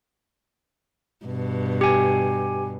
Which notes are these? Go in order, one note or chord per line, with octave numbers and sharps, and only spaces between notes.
G2 B2
G4 G#5